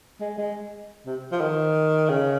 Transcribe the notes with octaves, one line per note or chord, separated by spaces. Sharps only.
G#3
G#3
C3
F3
D#3
C#3